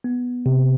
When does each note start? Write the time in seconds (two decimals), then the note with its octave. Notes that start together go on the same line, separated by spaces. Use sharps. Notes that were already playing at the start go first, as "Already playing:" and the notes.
0.04 B3
0.46 C3